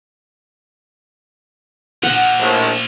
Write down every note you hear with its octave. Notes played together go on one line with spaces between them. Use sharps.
A#2 F3 F#5
A#1 A2